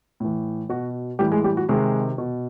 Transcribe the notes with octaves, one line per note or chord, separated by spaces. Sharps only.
A2 E3
B2 F#4
A2 E3 G3 G4
G#3 G#4
G3 G4
F#4
C3 D#3 G#3 G#4
B2